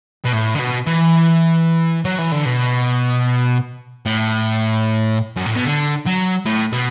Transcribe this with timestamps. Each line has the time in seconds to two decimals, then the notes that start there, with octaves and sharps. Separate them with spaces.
0.25 B2
0.33 A2
0.55 D3
0.59 B2
0.86 E3
2.05 F#3
2.18 E3
2.32 D3
2.46 B2
4.06 A2
5.37 F#2
5.46 A2
5.56 B2
5.66 D3
6.06 F#3
6.46 A2
6.73 B2